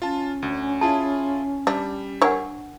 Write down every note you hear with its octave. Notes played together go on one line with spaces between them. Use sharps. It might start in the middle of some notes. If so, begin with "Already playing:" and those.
C#4 F4 A5
D2
E4 F4 G#4 A5
G3 D4
D4 A#4 C#5 F#5